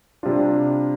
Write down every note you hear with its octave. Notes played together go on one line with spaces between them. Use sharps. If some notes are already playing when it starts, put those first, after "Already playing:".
C3 G3 D4 F4